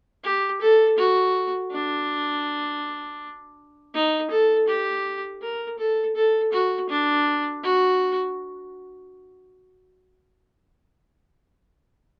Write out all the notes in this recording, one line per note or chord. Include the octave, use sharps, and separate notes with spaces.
G4
A4
F#4
D4
D#4
A4
G4
A#4
A4
A4
F#4
D4
F#4